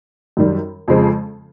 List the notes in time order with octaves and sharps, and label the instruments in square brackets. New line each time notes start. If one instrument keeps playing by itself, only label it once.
[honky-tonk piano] F#2 D#3 G3
F2 C#3 F3 G#3 C4